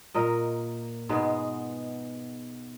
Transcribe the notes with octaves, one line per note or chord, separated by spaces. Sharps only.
A#2 A#4 D#5
G#2 B2 G#3 B3